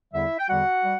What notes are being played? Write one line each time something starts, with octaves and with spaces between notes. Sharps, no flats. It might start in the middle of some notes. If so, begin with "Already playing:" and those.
E2 D3 G3 E4 E5
G5
E2 D3 G3 F#4 F#5
G3